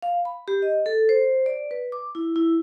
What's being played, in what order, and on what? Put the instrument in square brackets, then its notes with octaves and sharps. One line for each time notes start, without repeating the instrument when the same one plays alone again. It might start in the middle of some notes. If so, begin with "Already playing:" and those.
[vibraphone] F5
B5
G4
D#5
A4
C5
D5
B4
D6
E4
E4